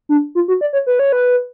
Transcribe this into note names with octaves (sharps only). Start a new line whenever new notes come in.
D4
F4
F#4
D5
C#5
B4
C#5
B4